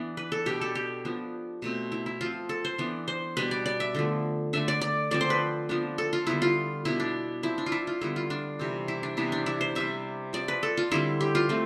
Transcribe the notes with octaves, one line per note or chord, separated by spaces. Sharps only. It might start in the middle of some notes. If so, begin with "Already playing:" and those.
Already playing: E3 B3 D4
B4
A4
B2 B3 D4 G4
A4
G4
F3 B3 D4
B2 A3 C4
E4
E4
F3 C4 F4
A4
C5
E3 B3 D4
C5
B2 G3 D4 B4
D5
D5
E5
D3 F3 A3
D3 A3 D4 E5
D5
D5
D3 F3 C4 D5
C5
B4
F3 B3 D4
A4
F4
D3 G3 B3 E4
F4
B2 B3 D4 E4
D4
F3 C4 E4
D4
F4
E4
F4
D3 G3 B3 E4
F4
D4
C3 E3 G3 C4
E4
D4
C3 E3 B3 D4 E4
D4
E4
C5
C3 G3 D4 E5
F3 C4 D5
B4
A4
F4
D3 G3 C4 E4
G4
F4
A3 C4